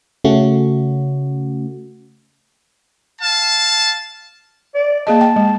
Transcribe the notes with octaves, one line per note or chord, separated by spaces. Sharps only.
C#3 A3 C#4 F#4
F5 A5
D5
A#3 G#4 D#5 A5
G5
G#3